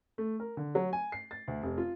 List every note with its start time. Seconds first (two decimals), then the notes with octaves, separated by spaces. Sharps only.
0.18 A3
0.40 A#4
0.57 D3
0.75 F#3
0.93 G#5
1.12 C7
1.31 A6
1.48 D2
1.63 F1
1.78 F4